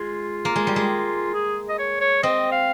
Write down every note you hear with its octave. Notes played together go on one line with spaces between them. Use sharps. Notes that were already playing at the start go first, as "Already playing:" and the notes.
Already playing: G#3 F4
A#3
G#3
G3
G#3
G#4
D#5
C#5
C#5
C4 D#5
F5